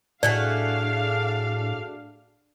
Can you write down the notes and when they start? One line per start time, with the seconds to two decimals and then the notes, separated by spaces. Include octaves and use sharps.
0.23 A2 A3 D4 F#4 G#4 D5 F5